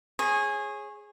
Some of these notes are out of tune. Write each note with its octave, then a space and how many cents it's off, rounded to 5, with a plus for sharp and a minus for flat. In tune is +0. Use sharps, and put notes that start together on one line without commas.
G#4 +0 C#5 -25